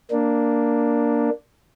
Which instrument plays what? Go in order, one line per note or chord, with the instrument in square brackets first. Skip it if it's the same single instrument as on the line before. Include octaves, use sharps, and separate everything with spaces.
[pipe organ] A#3 D4